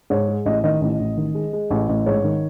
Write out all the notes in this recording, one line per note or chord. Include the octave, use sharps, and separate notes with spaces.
G#2 C#5
G#3
A1 D#5
D#3 D#5
A1
A1
D#3
G#3
G#3
A1
A1
G#2 C#5
D#3